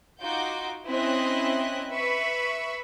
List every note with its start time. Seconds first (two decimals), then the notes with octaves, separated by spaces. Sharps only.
0.21 D#4 F4 F#4 D6 G6
0.88 C4 C#4 E4 D#5 E5 F#6
1.92 B4 E5 B5 C#6